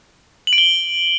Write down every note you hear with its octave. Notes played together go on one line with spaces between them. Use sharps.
F#7
D7
G7